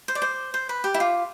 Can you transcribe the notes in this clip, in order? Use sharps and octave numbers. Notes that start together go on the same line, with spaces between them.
C5
D5
C5
C5
B4
G4
E4
F4